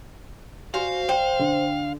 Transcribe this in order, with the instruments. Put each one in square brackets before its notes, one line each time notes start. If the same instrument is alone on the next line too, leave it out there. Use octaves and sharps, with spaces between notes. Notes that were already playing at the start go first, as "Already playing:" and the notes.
[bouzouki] F#4 C5 [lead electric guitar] F5 [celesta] G#5
[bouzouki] C5 [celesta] G5
[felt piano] D3